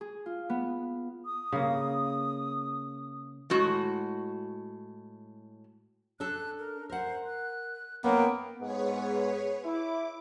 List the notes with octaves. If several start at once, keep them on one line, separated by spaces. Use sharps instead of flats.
G#4
F4
B3
D#6
C#3 A#3
A2 G#3 F#4
D4 A4 F#6
A#4
A#4 C5 F#5
F#6
A#3 B3 C#4 D#4 G5
G#2 B3 G#4 B4 C#5
E4 D6